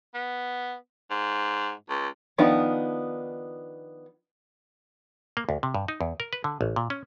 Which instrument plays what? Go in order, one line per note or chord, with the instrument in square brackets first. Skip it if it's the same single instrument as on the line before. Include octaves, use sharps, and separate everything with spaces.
[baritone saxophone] B3
G#2
C#2
[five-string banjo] D#3 F3 B3 D4 D#4
[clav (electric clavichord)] A#3
D2
C3
G2
D#4
E2
A#4
B4
D3
A1
A#2
C#4